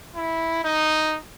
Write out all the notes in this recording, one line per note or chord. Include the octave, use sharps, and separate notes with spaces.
E4
D#4